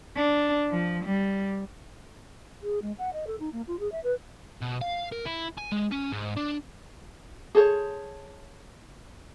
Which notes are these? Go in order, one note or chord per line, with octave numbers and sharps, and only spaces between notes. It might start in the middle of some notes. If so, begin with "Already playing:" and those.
D4
F3
G3
G#4
G#3
F#5
D#5
A4
D#4
A#3
F4
G#4
E5
B4
B2
F5
A#4
E4
G#5
G#3
C#4
G#2
D4
G#4 A4 C5 C#5